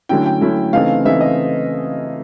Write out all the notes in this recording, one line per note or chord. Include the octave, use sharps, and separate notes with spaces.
D3 F#3 A3 C#4 E4 G5
G5
D3 F#3 A3 C#4 E4
C#3 E3 A3 C4 D#4 F5
C#3 E3 A3 C4 D#4 E5
D#5